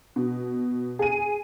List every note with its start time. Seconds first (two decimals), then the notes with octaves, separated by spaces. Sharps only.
0.16 B2
0.99 G#4 D#7